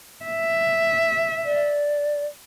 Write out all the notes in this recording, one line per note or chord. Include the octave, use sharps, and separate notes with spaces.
E5
D5